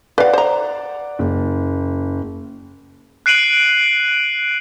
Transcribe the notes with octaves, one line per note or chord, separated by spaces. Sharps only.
B4 D5 F5 F#5
C5 A#5
F#1
F#6 C7 D7 D#7 F#7